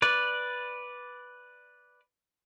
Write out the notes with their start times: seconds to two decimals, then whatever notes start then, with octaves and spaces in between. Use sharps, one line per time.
0.02 B4 D5